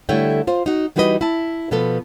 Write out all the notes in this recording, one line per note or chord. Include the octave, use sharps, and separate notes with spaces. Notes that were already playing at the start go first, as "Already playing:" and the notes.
D3 G3 A3 E4 C#5 G5
F4 C5
D#4 F#4
E3 G3 D#4 F#4 B4 D#5
E4 A5
B2 F3 B3 A4